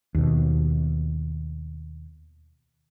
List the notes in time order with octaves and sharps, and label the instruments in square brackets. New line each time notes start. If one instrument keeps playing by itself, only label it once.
[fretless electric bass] D#2 B2